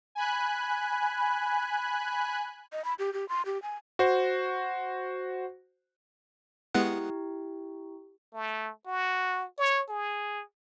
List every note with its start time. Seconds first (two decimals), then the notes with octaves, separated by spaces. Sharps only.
0.15 G#5 B5 F#6
2.72 D#5
2.85 B5
2.99 G4
3.13 G4
3.29 C6
3.46 G4
3.62 G#5
3.99 F#4 C5
6.74 G#3 B3 E4 G4 F#5
8.35 A3
8.86 F#4
9.58 C#5
9.89 G#4